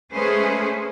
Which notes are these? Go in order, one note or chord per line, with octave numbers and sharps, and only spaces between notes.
G#3 A3 C#4 G#4 B4 C5